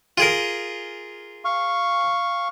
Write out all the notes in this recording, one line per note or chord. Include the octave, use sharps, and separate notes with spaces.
F4 G#4 A#4
F5 C#6